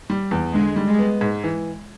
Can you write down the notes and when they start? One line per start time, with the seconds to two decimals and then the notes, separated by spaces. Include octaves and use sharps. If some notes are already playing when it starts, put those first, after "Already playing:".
0.10 G3
0.31 E2
0.54 D3 G#3
0.76 G3
0.87 G#3
0.99 B3
1.21 G#2
1.44 E3